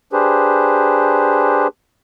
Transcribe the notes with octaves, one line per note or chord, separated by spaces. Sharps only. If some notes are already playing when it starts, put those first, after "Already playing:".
D4 G4 G#4 B4 C5